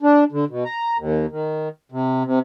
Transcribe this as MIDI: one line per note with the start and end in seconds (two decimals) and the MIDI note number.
0.02 0.24 62
0.32 0.45 50
0.50 0.64 47
0.65 0.97 82
0.98 1.26 39
1.31 1.68 51
1.92 2.23 48
2.25 2.39 48